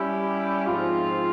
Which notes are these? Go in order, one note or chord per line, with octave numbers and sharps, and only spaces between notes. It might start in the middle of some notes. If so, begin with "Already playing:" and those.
Already playing: G3 C#4 E4 G4
G#2 F3 C4 F4